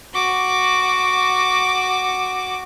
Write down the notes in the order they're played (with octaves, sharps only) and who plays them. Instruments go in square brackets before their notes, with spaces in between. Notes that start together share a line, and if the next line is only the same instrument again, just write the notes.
[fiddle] F#4 D6